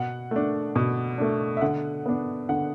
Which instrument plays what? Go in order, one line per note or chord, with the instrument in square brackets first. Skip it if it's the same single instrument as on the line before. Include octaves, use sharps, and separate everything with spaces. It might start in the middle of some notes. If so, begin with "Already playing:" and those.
Already playing: [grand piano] B2 F#5
A3 D4
B2
A3 D4
E5
D3 F#5
B3 D4
D3 F#5